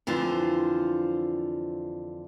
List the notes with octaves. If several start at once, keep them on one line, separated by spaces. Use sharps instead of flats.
F2 D3 E3 F4 C5